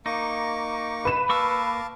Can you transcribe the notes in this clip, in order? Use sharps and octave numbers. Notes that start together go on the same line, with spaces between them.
A#3 D#4 C#6 D6
B4 E7
A#3 F5 A5 C#6 D6 E6